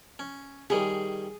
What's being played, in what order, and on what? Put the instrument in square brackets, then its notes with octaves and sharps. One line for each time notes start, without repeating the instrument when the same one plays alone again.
[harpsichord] C#4
[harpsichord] D#3 G3 C#5 [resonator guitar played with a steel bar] G#4